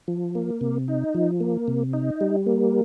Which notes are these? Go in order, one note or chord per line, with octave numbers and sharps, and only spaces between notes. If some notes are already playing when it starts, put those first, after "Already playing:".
F3
A#3
C3
D#4
F3
A#3
C3
D#4
G3
A#3